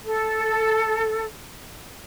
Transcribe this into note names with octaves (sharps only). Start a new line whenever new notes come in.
A4